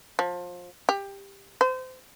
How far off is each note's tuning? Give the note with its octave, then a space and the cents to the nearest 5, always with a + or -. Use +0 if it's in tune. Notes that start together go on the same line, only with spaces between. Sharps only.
F3 +25
G4 +15
C5 -30